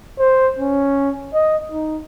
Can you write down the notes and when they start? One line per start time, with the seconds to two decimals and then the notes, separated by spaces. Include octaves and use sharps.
0.19 C5
0.59 C#4
1.34 D#5
1.72 D#4